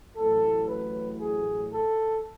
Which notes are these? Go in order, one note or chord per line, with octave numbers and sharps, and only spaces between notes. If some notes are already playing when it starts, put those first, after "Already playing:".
A1 A2 F#3 A4
B4
G#4
A4